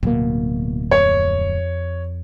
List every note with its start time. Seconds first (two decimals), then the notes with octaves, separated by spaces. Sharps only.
0.03 D1 B2 A#3
0.91 F2 C#5